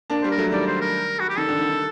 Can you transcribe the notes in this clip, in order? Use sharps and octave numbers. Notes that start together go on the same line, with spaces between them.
A#3 D4
G3 A#3 C5
A#4
F#3 A3
D#3 G3 D5
C5
A#4
F#4
G4
D#3 A4
D3
D#3
D#3